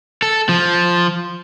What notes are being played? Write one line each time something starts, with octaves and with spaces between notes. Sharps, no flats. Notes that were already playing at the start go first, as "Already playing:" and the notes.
A4
F3